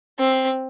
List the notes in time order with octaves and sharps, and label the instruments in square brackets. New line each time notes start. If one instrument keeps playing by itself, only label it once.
[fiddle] C4